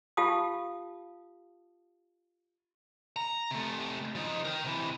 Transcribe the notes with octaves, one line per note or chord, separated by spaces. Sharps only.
F4 G4 F5 A5 D#6
A#5
C3 A3
F3 D#4
A#4 G5
C3 E3